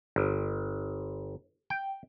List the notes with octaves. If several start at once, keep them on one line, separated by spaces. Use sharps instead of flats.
G1
G5